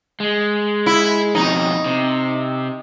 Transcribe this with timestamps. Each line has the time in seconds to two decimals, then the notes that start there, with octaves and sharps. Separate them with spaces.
0.20 G#3
0.86 E4
1.35 F2 B2 D#4
1.86 C3